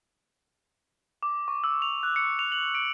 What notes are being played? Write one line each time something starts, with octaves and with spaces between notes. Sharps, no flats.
D6
C#6
E6
F7
F#6
C#7
F7
F#7
D7